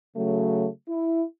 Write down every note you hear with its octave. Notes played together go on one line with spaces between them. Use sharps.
C#3 F#3 A3
E4